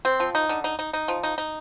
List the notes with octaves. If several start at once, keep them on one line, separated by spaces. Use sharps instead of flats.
C4
F3
D#4
D3
D#4
D#4
D#4
F3
D#4
D#4